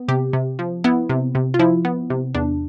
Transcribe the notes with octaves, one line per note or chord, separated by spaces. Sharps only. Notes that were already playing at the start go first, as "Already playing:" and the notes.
Already playing: B3
C3 G4
C3
F3
B3 E4
C3
C3
F4
F3 E4
B3
C3
E2 D4